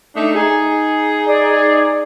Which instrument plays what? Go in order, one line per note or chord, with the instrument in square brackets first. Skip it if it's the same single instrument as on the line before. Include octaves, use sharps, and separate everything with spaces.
[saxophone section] A3 D4 D#4
D#4 G#4
[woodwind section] D5